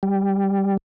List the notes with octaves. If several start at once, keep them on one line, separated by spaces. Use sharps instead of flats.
G3